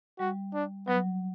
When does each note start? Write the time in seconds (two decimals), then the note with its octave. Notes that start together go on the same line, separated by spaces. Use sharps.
0.19 G3 F#4
0.54 D4
0.88 F#3 B3